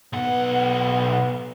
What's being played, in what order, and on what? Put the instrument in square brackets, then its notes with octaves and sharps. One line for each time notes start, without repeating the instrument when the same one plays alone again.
[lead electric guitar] B1 F#5 [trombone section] B3